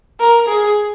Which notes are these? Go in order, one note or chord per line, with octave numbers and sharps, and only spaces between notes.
A#4
G#4